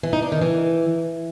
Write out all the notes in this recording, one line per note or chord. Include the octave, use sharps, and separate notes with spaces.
E3
D#4
D4
D#3
E3